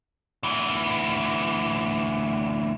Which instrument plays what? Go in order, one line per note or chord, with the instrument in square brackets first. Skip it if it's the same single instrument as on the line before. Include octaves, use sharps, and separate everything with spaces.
[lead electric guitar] D2 E3